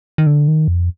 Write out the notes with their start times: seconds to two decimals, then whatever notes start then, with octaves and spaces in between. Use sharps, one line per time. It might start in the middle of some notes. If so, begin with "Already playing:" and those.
0.18 D#3
0.26 D3
0.48 D#3
0.68 F2